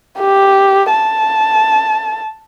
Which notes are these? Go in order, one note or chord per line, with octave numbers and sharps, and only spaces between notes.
G4
A5